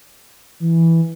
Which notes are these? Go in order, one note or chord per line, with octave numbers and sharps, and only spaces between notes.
E3